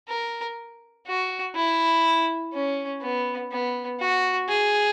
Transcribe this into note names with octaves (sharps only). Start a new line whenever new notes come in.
A#4
F#4
E4
C#4
B3
B3
F#4
G#4